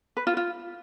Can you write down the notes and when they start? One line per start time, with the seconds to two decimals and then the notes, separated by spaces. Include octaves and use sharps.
0.17 B4
0.27 F4
0.37 F4